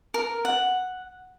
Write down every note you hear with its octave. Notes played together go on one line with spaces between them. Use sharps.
A#4
F#5